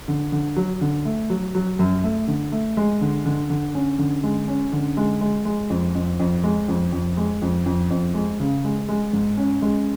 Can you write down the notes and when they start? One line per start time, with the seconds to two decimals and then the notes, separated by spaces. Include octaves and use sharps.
0.08 D3
0.32 D3
0.56 F#3
0.81 D3
1.05 A3
1.30 F#3
1.55 F#3
1.79 F#2
2.04 A3
2.28 D3
2.52 A3
2.77 G#3
3.01 D3
3.26 D3
3.50 D3
3.75 C#4
3.99 D3
4.23 G#3
4.48 C#4
4.73 D3
4.97 G#3
5.21 G#3
5.45 G#3
5.70 F2
5.95 F2
6.20 F2
6.44 G#3
6.68 F2
6.93 F2
7.17 G#3
7.42 F2
7.66 F2
7.91 F2
8.14 G#3
8.40 C#3
8.64 G#3
8.89 G#3
9.13 G#2
9.37 C#4
9.62 G#3